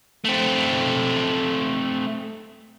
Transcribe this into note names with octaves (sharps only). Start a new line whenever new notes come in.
A3 C4